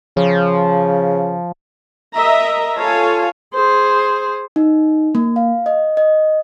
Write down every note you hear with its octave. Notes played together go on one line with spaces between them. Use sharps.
C#3 F3
A#4 D#5 E5 A#5
F4 A4 C#5 F5 G#5 A5
G#4 C5
D#4
A#3
F5
D#5
D#5